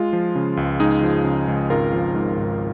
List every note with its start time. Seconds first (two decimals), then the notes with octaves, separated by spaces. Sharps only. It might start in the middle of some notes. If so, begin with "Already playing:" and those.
Already playing: G#3 F4
0.13 F3
0.35 C#3
0.57 C#2
0.80 G#3 D#4 G#4
1.03 F3
1.24 C#3
1.48 C#2
1.70 G#1 F4 A#4
1.93 F3
2.15 G#2
2.37 G#1